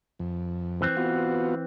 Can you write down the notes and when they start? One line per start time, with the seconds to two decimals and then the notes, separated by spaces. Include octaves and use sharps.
0.19 F2
0.82 E3 C4
0.97 B3 F4 F#4